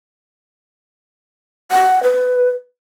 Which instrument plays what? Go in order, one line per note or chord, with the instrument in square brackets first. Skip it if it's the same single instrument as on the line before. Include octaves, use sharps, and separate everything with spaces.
[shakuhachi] F#5
B4